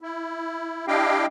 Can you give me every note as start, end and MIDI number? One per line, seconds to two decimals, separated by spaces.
0.01 0.87 64
0.88 1.26 62
0.88 1.26 64
0.88 1.26 67
0.88 1.26 75
0.88 1.26 77
0.88 1.26 79